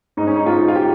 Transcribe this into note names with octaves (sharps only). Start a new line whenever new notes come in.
G#2 D#4
C#4
D#4
G#2 F4
F4
G4